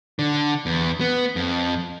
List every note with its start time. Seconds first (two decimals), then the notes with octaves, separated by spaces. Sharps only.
0.19 D3
0.66 E2
1.01 B3
1.36 F2